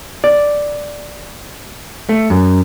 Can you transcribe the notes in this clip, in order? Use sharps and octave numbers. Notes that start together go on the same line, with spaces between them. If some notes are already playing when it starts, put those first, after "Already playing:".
D5
A3
F#2